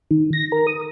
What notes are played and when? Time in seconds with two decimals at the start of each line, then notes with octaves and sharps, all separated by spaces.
0.11 D#3
0.33 A#6
0.52 A#4
0.67 D#6